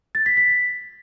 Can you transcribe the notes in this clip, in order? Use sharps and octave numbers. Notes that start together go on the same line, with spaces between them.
A6
B6
B6